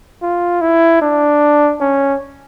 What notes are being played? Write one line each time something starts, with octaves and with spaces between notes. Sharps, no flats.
F4
E4
D4
C#4